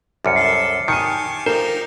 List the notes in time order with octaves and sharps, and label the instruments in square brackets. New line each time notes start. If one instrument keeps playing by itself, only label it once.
[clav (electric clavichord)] C2 F#2 [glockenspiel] D6 F6 C#7
[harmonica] A4 E5 [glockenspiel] C7
[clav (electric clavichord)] D#3 [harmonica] G4 G#5 A5 [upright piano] C#7 D#7
[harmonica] F3 D#4 G4 [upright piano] A#4 [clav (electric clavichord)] C5